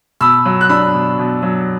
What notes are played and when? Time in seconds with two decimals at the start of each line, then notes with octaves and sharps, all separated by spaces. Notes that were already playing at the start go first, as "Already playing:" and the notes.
0.21 B2 B5 E6
0.45 F#3
0.61 F#6
0.69 D4 B5 E6
0.94 B2
1.19 B2
1.42 F#3